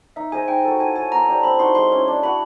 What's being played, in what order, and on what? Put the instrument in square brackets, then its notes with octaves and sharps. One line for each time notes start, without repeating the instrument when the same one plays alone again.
[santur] D#4 [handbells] E5
[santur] G#4 C5 D#5 [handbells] G#5
[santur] D#4 [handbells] G5
[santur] F#4 A4
[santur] E4 [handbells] G#5
[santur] A4 C#5 [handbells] G#5
[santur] B3 [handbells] A#5
[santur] D4 G4 C5
[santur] C4 [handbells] B5
[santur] D#4 F#4 [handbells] C6
[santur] G#3 [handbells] C6
[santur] C#4 E4
D4
[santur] F#4 B4 [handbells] B5